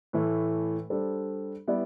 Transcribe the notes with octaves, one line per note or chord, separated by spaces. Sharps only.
A2 E3 A3
G3 D4 A4 C5
G3 B3 E4 B4 D5